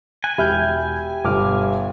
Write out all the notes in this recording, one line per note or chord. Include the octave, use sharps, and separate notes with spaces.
G#5 F#6
E1 G4 E5 G5 B5 F6 G6
G1 B2 D6 F6